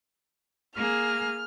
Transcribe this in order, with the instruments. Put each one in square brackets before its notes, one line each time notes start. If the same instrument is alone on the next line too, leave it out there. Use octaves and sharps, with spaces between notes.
[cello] A#3 G#4 [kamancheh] F6